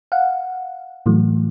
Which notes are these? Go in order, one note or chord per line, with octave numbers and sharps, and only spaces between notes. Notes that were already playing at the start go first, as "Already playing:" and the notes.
F5 F#5
A2 E3 F#3 A3